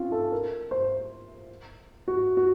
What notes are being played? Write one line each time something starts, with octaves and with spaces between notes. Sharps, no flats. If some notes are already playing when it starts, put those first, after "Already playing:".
Already playing: C4 C#4 D#4 F4
A4
A#4
C5
F#4
F#4